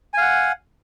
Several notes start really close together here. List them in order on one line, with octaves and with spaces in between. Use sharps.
G#5 F5 F#5